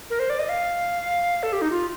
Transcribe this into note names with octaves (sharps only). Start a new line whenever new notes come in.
A#4
C5
D5
D#5
F5
A4
G4
D#4
F4